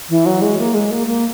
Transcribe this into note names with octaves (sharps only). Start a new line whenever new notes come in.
E3
F#3
G#3
A#3
G#3
A#3
A#3